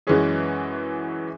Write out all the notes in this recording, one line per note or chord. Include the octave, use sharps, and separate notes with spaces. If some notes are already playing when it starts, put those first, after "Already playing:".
F#2 E3 G#3 C#4 G#4